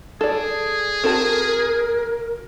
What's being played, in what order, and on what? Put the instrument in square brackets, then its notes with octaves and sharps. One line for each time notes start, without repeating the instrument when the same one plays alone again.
[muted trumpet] G#4 [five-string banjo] A4 D5
[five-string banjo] C4 F#4 A5 [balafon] A4 [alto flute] A#4